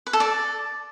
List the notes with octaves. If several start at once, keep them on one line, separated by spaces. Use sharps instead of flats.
B4
A4
D5